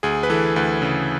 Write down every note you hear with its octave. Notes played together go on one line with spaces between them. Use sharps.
D2 G#4
B4
E3 A4
D2 B4
C#3